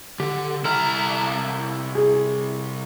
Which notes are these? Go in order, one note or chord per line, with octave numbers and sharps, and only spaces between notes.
D3 G4
C2 E4 A4 A#5 F6
G#4